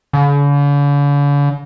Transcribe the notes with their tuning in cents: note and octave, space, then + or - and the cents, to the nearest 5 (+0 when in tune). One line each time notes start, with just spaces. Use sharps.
D3 -45